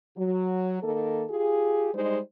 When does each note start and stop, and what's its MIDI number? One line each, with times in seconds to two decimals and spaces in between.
0.17 0.81 54
0.83 1.24 51
0.83 1.24 58
0.83 1.24 69
1.30 1.89 65
1.30 1.89 67
1.30 1.89 68
1.94 2.18 55
1.94 2.18 56
1.94 2.18 63
1.94 2.18 72